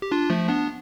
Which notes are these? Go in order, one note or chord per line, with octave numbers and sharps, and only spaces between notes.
G4
D4 F4
F3 A3
B3 D4